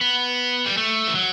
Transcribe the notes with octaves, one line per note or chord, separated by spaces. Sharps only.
B3
G3
A3
E3
F#3